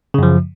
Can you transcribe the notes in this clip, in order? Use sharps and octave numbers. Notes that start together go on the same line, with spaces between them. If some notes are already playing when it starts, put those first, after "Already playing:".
F#2 C#3 F3